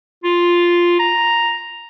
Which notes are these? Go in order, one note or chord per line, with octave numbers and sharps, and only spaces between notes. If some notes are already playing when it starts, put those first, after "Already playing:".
F4
A#5